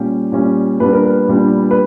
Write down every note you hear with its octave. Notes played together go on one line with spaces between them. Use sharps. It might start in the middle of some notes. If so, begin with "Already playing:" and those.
Already playing: A#2 G3 C#4 G4
A#2 G3 C#4
A#2 G3 B3 D4 B4
A#4
B4
A#2 G3 B3 D4
B4